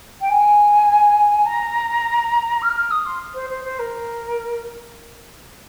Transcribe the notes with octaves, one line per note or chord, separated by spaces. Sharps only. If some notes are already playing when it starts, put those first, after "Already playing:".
G5
G#5
A#5
F6
F6
D#6
C6
C5
C5
C5
A#4